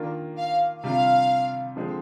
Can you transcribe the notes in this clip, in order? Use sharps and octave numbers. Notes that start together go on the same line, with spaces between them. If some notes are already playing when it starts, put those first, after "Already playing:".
Already playing: D#3 A#3 D4 F4
F5
C3 G3 D4 F4 F5
D3 F3 G#3 C4